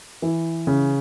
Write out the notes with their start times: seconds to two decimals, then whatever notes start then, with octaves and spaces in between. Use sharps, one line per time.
0.22 E3
0.67 C#3